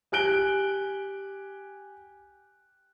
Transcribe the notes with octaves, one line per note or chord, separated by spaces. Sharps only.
G4 G#5 F#6 D7 G7